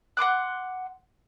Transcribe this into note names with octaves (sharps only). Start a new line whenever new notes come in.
F#5 C6 D6 F#6